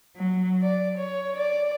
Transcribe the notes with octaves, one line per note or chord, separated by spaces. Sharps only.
F#3
D5
C#5
D5